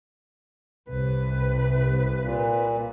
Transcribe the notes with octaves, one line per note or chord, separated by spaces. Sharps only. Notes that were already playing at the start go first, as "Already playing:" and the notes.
C2 C3 B4
A#2